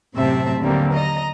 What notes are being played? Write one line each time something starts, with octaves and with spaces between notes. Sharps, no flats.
F#2 A2 C3 C4 E5 A5
D#2 D3 F#3 G3 A#3 C4
D#5 A#5 A#6